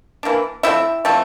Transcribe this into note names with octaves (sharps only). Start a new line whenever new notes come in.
E3 A#3 D4
F3 A3 C4 E4 E5
F3 A3 C4